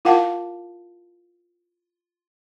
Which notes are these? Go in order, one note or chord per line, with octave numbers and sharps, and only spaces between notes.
E4 F4 A#4 F5 F#5 A5